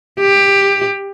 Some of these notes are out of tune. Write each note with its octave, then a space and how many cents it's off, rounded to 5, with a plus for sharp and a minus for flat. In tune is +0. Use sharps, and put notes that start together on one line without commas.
G4 +15